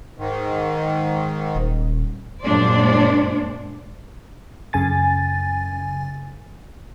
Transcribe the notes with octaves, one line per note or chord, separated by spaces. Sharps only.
G#2 D#3
D#1
F#2 A#2 G#3 D4 C5 D5
F#2 C#3 G#5 A6